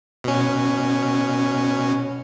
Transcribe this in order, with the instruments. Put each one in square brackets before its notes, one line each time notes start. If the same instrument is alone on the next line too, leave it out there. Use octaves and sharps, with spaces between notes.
[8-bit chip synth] B2 C#4